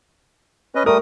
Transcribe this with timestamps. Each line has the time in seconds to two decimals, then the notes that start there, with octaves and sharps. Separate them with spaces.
0.75 C#4 B4 D#5
0.86 G3 A3 A#4 D#6